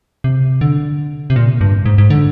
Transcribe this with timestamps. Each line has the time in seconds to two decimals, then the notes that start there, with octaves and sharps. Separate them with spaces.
0.24 C3
0.61 D3
1.30 C3
1.36 A#2
1.61 G2
1.86 G#2
1.98 G#2
2.10 D3